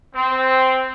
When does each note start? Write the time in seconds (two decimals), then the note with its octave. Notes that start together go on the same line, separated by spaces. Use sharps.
0.15 C4